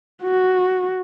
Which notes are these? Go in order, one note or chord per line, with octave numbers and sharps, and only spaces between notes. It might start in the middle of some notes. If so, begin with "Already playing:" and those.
F#4